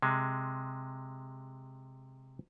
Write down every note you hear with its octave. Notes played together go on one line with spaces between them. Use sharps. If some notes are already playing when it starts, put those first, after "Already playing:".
C3 G#3